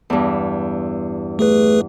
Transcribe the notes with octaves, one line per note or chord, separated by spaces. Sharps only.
E2 G2
A3 G#4 B4